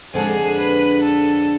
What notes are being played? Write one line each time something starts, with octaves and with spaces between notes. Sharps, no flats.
F2 D3 G#3 D4 G#4
B4
A4